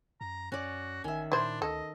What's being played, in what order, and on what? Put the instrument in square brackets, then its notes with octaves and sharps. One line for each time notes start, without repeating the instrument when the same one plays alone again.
[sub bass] F#2 [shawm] A#5
[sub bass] F#2 [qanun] C#4 D5 [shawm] F#4
[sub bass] A1 [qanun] D#3 E5 [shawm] G#5
[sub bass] A#2 [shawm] D4 [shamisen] E4 C5
[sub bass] D2 [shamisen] A4 [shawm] D#5